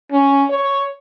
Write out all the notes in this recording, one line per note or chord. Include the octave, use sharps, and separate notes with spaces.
C#4
C#5